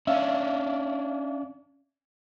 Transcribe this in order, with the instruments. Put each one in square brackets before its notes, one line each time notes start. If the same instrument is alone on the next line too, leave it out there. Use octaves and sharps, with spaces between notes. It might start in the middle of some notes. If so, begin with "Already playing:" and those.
[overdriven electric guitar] C#4 D4 [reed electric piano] E5 F5